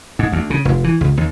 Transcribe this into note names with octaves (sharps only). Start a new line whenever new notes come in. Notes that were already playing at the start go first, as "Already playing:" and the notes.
G#2
D2
C#3
F1
E3
C#2
D#2